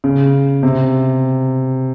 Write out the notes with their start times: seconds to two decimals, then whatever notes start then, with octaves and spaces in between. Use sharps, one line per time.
0.04 C#3
0.63 C3